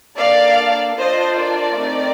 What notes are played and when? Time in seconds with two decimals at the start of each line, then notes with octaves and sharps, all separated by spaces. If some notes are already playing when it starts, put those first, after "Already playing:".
0.17 A#3 D4 A4 D5 F5
0.96 D4 F4 A4 C5 D#5
1.36 A#4 D5
1.77 A3 C4 D#4 G4